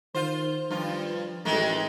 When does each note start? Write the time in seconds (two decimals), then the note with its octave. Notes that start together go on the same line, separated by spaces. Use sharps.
0.15 D#3 F4 C5
0.71 G2 F3 F4
1.45 A1 D#3 G#3 A3